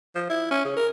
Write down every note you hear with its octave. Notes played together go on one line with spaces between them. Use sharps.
F3
E4
C#4
C#3
A#4